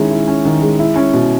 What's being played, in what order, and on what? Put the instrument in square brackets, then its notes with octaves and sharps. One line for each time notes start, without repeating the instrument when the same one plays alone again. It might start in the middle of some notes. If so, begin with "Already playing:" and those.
Already playing: [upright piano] D#3 G#3 C#4 E4
E4
C#4
D#3
G#3
E4
C#4
B2